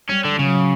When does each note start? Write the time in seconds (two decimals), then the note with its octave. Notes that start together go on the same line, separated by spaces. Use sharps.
0.09 G3 C#4
0.25 D3
0.39 C#3 F#3